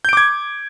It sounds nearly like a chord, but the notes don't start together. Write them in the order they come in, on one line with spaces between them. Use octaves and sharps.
G6 D7 D6 G#6